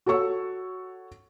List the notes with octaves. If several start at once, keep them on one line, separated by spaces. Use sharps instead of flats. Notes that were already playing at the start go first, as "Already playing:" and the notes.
F#4 A4 C#5 C#6 E6